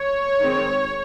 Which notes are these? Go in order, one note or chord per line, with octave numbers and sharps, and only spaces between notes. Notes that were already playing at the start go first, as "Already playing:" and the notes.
Already playing: C#5
D#3 G#3 C4